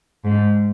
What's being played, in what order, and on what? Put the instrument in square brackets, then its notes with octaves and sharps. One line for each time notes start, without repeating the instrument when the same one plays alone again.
[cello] G#2